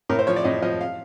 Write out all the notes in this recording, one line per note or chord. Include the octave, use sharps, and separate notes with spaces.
A2 A#4
C5
F3 C#5
D5
A2 D#5
F3 D#5
F5